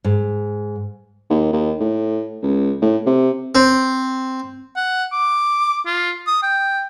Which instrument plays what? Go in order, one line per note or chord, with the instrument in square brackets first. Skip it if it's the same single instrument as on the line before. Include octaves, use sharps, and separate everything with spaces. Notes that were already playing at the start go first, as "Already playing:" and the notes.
[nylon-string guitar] G#2
[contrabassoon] D#2
D#2
A2
C#2
A2
C3
[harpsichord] C4
[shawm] F#5
D6
F4
D#6
G5